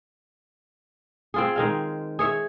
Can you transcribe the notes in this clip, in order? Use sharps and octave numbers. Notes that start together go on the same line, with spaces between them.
C4 F4 G#4
D#3 G#3 F5
G#4 C#5 E5